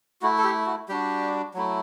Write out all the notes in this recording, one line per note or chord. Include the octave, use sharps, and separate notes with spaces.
A3 E4 F#4
A4
G4
F#4
G3 D4 F#4 G4
F#3 A3 E4